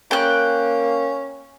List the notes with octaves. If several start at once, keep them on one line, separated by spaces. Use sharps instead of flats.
A#3 C#4 G5 F#6